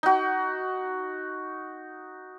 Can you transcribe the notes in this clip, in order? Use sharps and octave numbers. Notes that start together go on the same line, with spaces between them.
D#4 F#4